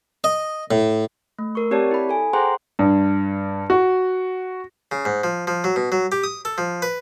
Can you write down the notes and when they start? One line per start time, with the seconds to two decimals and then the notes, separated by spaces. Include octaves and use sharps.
0.24 D#5
0.71 A2
1.39 A3
1.55 A#4 C#6
1.71 C4 G4 C#5 D5 A5
1.91 E4 B5
2.09 A4 G#5
2.33 G#4 C5 F#5 G5 A#5 C6
2.79 G2
3.70 F#4
4.91 C#3
5.05 G#2
5.24 F3
5.47 F3
5.64 F#3
5.76 B2
5.92 F#3
6.12 G4
6.24 D#6
6.45 A4
6.58 F3
6.82 B4